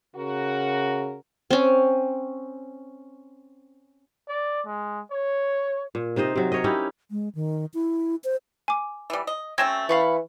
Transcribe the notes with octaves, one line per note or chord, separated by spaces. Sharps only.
C#3 F#4 A#4
C4 C#4
D5
G#3
C#5
A#2
C3 D#4 C5 D#5
C3 F#3
A#4 C#5 D#5
C#4 D#4 E4 G4
G#3
D#3
E4
C5
G#5 D6
E3 G3
D#5
F#3 A3 C4 C#4 G#6 A#6 E7
E3 F5 B5 C#6